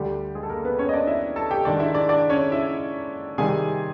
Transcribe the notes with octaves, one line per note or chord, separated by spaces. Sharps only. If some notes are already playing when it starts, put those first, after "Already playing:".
Already playing: D2 D3 G3 G4
G#3 G#4
A4
A#3 A#4
B3 B4
C#4 C#5
D#5
D4 D5
E4 E5
A4 A5
G4 G5
G#2 D#3 G#3 D4 D5
E4 E5
D4 D5
D4 D5
C#4 C#5
E4 E5
C3 D#3 G3 G#4 G#5